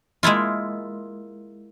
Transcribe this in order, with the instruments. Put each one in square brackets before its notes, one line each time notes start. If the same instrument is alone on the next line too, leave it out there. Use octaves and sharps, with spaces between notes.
[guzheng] G#3 A#3 E4 F4